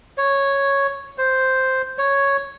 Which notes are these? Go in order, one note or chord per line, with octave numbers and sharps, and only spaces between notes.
C#5
C5
C#5